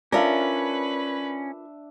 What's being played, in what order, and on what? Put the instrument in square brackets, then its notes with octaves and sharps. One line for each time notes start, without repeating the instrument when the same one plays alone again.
[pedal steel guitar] C#4 [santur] D4 E5 [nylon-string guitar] F4 A#4 [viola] B4